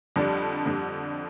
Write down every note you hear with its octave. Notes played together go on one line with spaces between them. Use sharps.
F2 D3 G3 D4
F2 D3 G3 D4